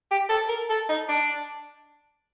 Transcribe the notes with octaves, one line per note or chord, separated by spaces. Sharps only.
G4
A4
A#4
A4
D#4
D4